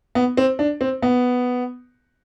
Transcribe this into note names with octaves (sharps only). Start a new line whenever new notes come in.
B3
C4
D4
C4
B3